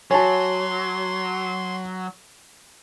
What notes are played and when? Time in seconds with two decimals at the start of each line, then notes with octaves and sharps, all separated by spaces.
0.11 F#3 F#4 C#5 G#5 A5 C6